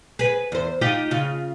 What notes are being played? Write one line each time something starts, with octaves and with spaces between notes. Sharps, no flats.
G#4 B4
E2 C5
D#4 F4 G4
C#3 F4